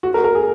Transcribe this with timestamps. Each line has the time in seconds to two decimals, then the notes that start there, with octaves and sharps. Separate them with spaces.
0.03 F#4
0.14 A#4
0.24 A#4
0.35 G#4